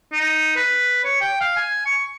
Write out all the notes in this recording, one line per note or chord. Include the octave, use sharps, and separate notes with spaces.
D#4
B4
C#5
G5
F5
G#5
C#6